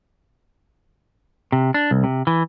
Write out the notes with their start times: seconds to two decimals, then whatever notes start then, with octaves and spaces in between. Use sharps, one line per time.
1.52 C3
1.74 D4
1.91 C2
2.04 C3
2.27 E3